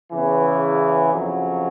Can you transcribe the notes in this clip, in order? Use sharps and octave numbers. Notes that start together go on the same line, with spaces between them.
E2 C#3 E3
F2 C#3 F#3